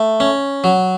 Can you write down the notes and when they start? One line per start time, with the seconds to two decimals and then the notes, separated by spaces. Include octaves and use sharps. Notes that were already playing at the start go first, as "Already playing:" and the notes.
Already playing: A3
0.20 C#4
0.64 F#3